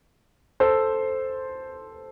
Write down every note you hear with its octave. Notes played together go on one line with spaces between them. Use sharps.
A4 C5